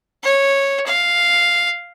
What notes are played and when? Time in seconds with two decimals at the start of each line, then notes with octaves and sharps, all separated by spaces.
0.23 C#5
0.87 F5